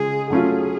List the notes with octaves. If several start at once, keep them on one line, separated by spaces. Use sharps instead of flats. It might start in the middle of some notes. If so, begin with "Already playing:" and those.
Already playing: C#3 G#3 F4 G#4
F#3 A3 C#4 F4 G#4